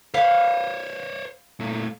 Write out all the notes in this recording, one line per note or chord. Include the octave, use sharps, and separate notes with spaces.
C5 C#5 F5 F#5 B5
A#2 A3